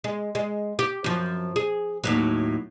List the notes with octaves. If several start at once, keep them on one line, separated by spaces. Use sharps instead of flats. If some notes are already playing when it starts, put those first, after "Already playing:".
G#3
G#3
G4
F#2 F3
G#4
D#2 A2 F#3